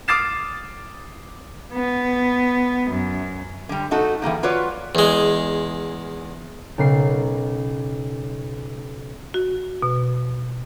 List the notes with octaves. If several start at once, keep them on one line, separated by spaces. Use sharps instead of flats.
D6 D#6 F6 A6 C7 E7
B3
F#2
D3 G3
A3 D#4 F#4 A4
E3 G3 A#3 G#4
F4 F#4 B4 C#5 D5
E2 G#3
B1 C#3 A#4 C7
F#4
B2